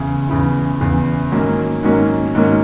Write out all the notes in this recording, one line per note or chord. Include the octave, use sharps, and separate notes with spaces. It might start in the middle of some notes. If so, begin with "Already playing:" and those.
Already playing: E2 C#3
E2 C#3 E3
E2 C#3 E3
G#2 D#3 F#3 A#3 C#4
G#2 D#3 F#3 A#3 C#4
G#2 D#3 F#3 A#3 C#4